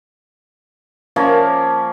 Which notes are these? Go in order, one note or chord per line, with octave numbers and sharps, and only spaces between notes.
F3 A#3 C#4 D5